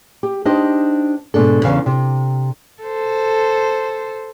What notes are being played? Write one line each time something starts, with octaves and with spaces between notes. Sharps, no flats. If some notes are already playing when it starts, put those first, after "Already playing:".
G4
D4 D#4 G4 C5 D#5
G#2 B2 D4 A4
E2 C#3 E3 F5
C3
A4 C5